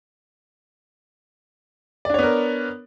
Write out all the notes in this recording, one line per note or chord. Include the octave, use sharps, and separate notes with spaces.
B3 D4 A#4 C#5 D5